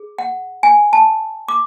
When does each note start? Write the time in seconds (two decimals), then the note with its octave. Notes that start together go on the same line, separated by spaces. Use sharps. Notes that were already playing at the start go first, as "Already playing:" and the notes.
Already playing: G#4
0.18 F#5
0.63 G#5
0.93 A5
1.48 D6